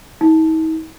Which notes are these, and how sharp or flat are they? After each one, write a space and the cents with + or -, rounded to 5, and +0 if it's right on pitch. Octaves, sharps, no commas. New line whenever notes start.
D#4 +45